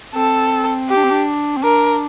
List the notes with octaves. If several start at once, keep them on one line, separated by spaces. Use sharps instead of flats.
C4 A4
G4
D4
C4
D4
C4
D4 A#4